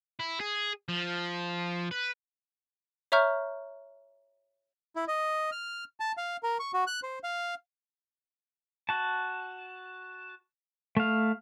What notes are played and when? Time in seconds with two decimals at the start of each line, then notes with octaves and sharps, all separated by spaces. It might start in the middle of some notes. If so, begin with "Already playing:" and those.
0.19 E4
0.40 G#4
0.89 F3
1.91 B4
3.12 C#5 E5 A#5 C#6 F6 G6
4.96 E4
5.08 D#5
5.52 F6
6.00 A5
6.17 F5
6.43 A#4
6.60 C#6
6.74 F#4
6.87 F#6
7.03 C5
7.24 F5
8.89 F#4 A5
10.97 A3 F5